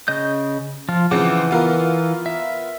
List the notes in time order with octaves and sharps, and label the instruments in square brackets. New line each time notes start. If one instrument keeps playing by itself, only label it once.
[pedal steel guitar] C#3 D#5 G6
F3 F4
[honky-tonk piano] C#3 F3 C4 [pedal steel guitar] E3 F#5 D6
[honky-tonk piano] B3 F4 A#4
[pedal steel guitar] E5